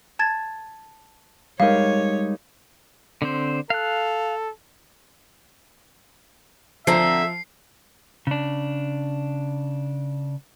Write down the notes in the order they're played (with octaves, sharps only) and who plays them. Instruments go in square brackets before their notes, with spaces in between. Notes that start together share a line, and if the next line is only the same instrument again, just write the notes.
[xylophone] A5 G#6 A6
[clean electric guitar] G3 G#3 D#4 [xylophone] A#4 F5 [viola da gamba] C#5
[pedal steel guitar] D3 C4 C5
[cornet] A4 [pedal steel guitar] F5 F#6
[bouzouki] D3 C4 A#5 [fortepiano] F3 [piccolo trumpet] E5 [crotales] C7
[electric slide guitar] C#3 D4